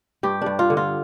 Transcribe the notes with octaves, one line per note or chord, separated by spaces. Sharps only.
G2 G4
G2 D4
F4
D3
F4